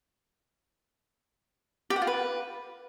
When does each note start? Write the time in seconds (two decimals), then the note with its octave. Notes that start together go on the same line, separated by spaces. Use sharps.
1.90 G4
1.96 F#5
2.02 F4
2.07 B4